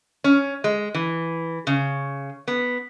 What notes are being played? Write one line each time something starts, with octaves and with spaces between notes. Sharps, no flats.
C#4
G#3
E3
C#3
B3